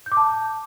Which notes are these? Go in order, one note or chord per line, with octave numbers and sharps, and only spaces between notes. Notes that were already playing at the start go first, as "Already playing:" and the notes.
G6
D6
A5